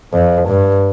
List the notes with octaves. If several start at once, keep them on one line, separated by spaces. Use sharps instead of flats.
F2
G2